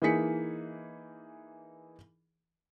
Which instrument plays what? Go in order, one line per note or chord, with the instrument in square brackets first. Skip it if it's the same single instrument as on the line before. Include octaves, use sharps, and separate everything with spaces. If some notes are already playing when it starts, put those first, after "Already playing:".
[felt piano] E3 A#3 D#4 G#4 B6 C#7